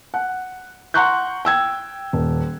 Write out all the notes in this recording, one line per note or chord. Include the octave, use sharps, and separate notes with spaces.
F#5
F#5 A#5 C6 C#6 F#6 G6
G5 E6 G#6
D#1